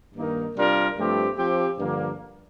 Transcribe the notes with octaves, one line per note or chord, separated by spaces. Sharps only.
G2 D#3 A#3 D#4 A#4
C3 G3 D4 F4 A#4
G2 F3 A3 C4 G4
F3 C4 G4
G2 D3 F3 A#3